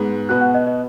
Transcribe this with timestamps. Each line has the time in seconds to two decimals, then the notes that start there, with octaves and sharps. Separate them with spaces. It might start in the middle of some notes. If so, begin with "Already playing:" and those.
Already playing: G#2 G#3 B3
0.29 B2 B3 F#4 F#6
0.41 F#5
0.54 D#5
0.67 D#5